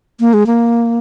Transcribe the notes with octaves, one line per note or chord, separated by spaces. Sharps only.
A#3
G#3
A#3